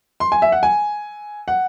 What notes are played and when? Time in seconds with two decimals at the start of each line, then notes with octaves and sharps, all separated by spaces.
0.20 C6
0.32 G#5
0.42 E5
0.52 F#5
0.63 G#5
1.48 F#5